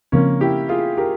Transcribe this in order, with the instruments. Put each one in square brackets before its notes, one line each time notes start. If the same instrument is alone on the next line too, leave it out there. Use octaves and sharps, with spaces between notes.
[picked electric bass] C#3 F3 C4 [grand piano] A#3 C#4
[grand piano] E4 G4
F4 G#4
G4 A#4